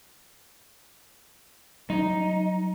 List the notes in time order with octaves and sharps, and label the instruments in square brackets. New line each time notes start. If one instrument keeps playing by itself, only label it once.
[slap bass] F#3 G3 [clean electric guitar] D#4